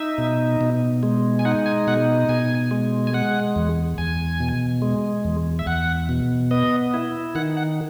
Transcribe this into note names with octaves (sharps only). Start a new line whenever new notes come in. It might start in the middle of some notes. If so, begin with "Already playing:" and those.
Already playing: D#4 E5
B2
B2
G#3
G#5
D#4 F#5
G#5
B2 F#5
B2 G#5
G#3
G#5
G#3 F#5
E2
E2 G#5
B2
G#3
E2
E5
E2 F#5
B2
B3 D#5
E4
D#3 F#5
F#5